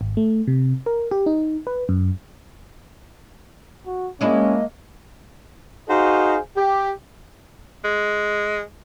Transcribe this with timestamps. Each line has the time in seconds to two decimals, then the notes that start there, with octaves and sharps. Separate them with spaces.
0.01 G#1
0.17 A3
0.47 C3
0.86 A#4
1.11 G4
1.26 D#4
1.67 B4
1.89 F#2
3.87 F#4
4.21 G#3 A#3 C#4 D4 E4 D#5
5.89 D#4 F#4 G#4 C5 D#5 F5
6.57 G4
7.85 G#3